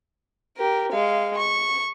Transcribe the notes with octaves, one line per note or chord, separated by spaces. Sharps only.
G4 A#4
G#3 F5
C#6